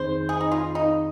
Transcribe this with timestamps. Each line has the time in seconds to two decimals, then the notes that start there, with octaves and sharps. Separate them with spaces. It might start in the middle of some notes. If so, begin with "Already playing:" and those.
Already playing: F2 D#3 C4 D#4 G#4 C5
0.29 G#4
0.41 D#4
0.52 F4
0.75 D#4